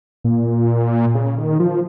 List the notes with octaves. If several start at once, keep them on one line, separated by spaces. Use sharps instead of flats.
A#2
C#3
D#3
F3